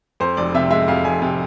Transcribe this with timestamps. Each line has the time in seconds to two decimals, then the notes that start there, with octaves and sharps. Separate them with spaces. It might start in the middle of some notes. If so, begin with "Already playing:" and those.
0.20 F2 C5
0.37 F1 D5
0.54 C3 E5
0.71 G#3 E5
0.88 F2 F5
1.05 F1 G#5
1.22 C3